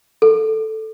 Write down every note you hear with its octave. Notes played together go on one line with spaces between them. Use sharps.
A4